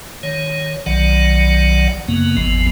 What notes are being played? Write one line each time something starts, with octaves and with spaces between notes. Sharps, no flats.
D#3 C#5
B1 D#3 F#3 D5 F#5
F#2 C#3 A#3 B3
G#1 E2 F3 B3